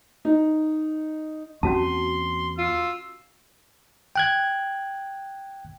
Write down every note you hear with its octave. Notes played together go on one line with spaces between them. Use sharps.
D#4
E2 A#3 C4 C#4 F#4 A5 C6
F4 E6
G5 F#6 G#6